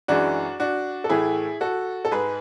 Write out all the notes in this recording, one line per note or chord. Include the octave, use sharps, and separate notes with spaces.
F#2 E3 G#3 D4 F#4
D4 F#4
A4
A2 E3 A3 E4 G#4
F#4 A4
A4
G#2 G#3 G#4 B4